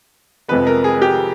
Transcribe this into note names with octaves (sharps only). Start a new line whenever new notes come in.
F2 C3 F3 G#3 B3 B4
A#4
G#4
G4